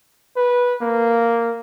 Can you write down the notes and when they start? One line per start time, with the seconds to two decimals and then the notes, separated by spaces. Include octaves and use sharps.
0.37 B4
0.81 A#3